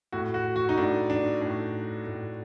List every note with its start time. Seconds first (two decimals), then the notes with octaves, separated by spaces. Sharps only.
0.12 A2 F#4
0.34 F#4
0.56 F#4
0.69 D#4
0.78 A2 D4
1.10 D4
1.41 A2 D4
2.07 A2